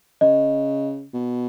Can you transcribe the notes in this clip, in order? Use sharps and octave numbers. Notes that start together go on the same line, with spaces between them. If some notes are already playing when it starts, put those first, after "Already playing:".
C#3 D#5
B2